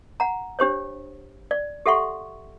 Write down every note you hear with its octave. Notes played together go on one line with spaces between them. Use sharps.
F#5 A#5
D4 G4 C5 C#5
D5
G4 A4 E5 F#5 C6 C#6